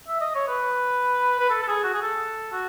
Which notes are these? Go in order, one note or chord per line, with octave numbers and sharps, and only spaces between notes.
E5
D#5
C#5
B4
B4
A4
A4
G#4
F#4
G#4
A4
F#4